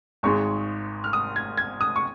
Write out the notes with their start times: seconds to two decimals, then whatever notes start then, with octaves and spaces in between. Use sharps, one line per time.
0.23 G#1 G#2 G#3 C#6
1.04 F6
1.13 D#6
1.36 G#6
1.57 G#6
1.81 D#6
1.96 C#6